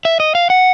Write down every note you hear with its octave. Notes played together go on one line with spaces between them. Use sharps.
E5
D#5
F5
F#5